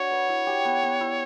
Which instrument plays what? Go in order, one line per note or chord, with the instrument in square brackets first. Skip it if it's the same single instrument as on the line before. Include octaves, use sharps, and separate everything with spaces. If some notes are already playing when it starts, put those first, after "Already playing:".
Already playing: [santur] D4 F#4 [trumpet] C#5
[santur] B4
E4
G4
B3
B3
E4